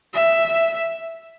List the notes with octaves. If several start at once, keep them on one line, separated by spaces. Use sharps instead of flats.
E5